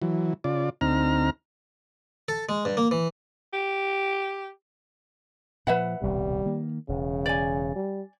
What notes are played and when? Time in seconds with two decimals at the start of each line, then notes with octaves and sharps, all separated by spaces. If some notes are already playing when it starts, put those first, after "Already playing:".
0.02 E3 F#3
0.44 C#3 F4 D5
0.81 D2 C4 D#4 A#5 F6
2.28 A4
2.49 G#3
2.65 G2
2.77 A#3
2.91 E3
3.53 G4
5.67 A#2 F3 B4 E5 F#5
6.02 D#1 C2 B2 G3
6.46 D#3 A#3
6.89 E1 C#3
7.26 D5 G#5
7.76 G3